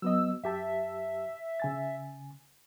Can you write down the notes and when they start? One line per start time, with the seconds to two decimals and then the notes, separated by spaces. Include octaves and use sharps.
0.02 F#3 B3 D#5 E6
0.44 F#2 G4 E5 A5
1.60 C#3 G#5 A6